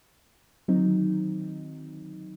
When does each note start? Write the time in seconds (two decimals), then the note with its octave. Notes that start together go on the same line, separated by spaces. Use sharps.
0.68 D3 D#3 F#3 C4 D#4